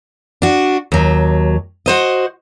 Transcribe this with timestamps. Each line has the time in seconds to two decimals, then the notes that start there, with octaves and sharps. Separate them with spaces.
0.42 D4 F#4
0.92 D#2 F#3
1.86 F#4 C5 D#5